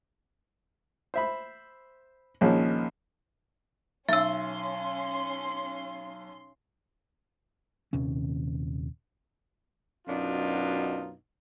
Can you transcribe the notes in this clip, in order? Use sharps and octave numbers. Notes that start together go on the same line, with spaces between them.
C5 E5 B5
A#1 D#2 F3 G#3 C#4
B1 C#4 E5 C6 E6
D#1 D#2 C3 C#4
F#2 B2 D4 D#4 F4